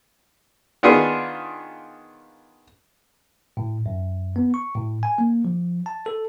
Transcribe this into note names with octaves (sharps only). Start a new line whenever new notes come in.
D#3 B3 D4 F4 G#4
A2
F#2
B3
C#6
A2
G#5
A#3
F3
A5
A4